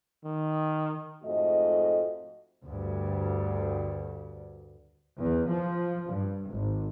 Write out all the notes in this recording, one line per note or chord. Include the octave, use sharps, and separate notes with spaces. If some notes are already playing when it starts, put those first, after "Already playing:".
D#3
F2 G#2 A3 F#4 D#5
D2 G2
E2
F3
G2
G#1